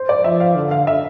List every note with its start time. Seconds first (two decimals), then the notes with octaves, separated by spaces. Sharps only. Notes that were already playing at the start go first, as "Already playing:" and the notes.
Already playing: C5
0.09 D5
0.24 F3 E5
0.40 F5
0.55 D3
0.71 F5
0.87 E5